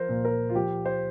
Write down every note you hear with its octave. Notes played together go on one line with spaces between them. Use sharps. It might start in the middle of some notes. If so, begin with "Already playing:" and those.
Already playing: F3 A#4 C5
A#2
A#4
F4
F3 G4
C5